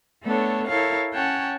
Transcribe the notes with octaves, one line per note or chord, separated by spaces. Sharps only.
A3 B3 D4 A4 C#5
E4 A4 A#4 C#5 F5
C#4 C#5 F#5 G5 A5